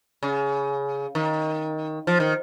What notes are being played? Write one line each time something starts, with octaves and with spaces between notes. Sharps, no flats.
C#3
D#3
F3
D#3